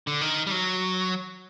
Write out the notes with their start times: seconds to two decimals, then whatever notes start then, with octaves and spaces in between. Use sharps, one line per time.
0.07 D3
0.21 D#3
0.47 G3
0.51 F#3